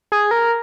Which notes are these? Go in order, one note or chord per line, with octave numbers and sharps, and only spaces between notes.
G#4
A#4